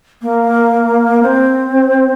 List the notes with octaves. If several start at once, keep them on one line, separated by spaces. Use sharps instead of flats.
A#3
C4